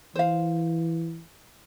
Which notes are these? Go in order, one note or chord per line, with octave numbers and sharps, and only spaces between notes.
E3 C5 F5